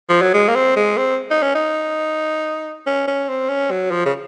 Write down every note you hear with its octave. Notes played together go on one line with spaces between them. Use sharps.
F3
F#3
G#3
A#3
C4
G#3
C4
D#4
C#4
D#4
C#4
C#4
C4
C#4
F#3
F3
C#3